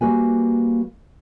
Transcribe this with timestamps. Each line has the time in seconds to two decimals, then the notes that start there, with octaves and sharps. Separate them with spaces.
0.01 G3 A#3 F#4 B4 G#5